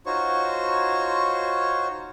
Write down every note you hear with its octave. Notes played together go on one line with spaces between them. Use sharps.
D#4 F4 F#4 C5 C#5 C#6